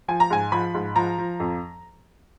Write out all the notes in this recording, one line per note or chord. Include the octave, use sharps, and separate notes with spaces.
F3 G#5
A#5
G#2 G#5
F3 B5
G#2
F3 A#5
F3
F2